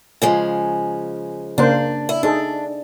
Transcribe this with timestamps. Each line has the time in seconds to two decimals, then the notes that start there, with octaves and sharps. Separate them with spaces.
0.22 C#3 F3 G#3
1.58 C#3 A#3 D4 C5
2.09 E4
2.23 D4 D#4 G#4 A4